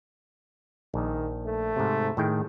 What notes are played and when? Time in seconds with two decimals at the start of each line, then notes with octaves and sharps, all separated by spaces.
0.94 A#1 D#3
1.45 A3
1.76 G#2 C3
2.17 A2 D#3 G#4 G5